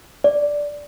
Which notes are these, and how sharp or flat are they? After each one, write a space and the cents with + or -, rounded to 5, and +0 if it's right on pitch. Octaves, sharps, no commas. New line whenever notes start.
D5 -5